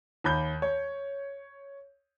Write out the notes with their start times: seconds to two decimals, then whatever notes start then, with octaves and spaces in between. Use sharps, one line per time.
0.24 D#2 B5 G6 G7
0.62 C#5